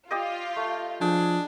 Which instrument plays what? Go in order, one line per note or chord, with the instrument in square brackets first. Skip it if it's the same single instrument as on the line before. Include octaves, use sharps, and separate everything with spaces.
[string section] F4 [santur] G4 D5 D#5
[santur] A3
[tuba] F3 [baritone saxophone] D4 [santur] G#4